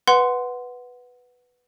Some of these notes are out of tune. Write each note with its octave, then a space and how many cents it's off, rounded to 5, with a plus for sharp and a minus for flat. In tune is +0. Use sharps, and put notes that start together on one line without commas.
B4 +0 F#5 -5 C6 -15